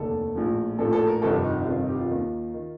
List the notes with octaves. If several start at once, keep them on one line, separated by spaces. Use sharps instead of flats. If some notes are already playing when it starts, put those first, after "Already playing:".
Already playing: F1 D#2 D3 A4
A#1 A2 F3
A#1 A2 F3 A4
A4
A#4
G1 F2 C3 D#3 A4
G4
D#4
D#4
G1 F2 C3 D#3 F4
D#4
G4
F4
D#2 D#3
D#3